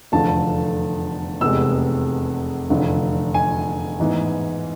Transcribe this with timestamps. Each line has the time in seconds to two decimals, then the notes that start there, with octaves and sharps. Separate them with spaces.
0.12 F1 E2 D3 F3 A3 A5
1.41 F1 E2 C3 G#3 B3 E6
2.70 F1 E2 D3 F3
3.34 G#5
3.99 A1 G#2 E3 B3